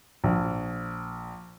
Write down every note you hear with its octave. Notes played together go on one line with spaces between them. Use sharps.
A#1